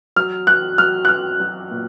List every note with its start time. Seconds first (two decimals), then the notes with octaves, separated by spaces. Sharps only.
0.16 F#3 F6
0.47 F#3 F#6
0.78 F#3 F6
1.05 F#6
1.09 F#3 F6
1.40 F#3
1.71 A#2